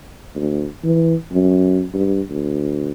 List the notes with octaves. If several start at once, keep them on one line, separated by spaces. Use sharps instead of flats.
D2
E3
F#2
G2
D2